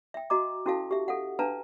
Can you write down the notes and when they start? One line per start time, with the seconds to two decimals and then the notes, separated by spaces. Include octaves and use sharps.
0.14 E5 G5
0.30 F#4 D#5 A#5 D6
0.66 C#4 E4 F#4 A4 F5 A5
0.91 G4 E5
1.08 A4 F5 F#5
1.39 D4 B4 F5 A5 A#5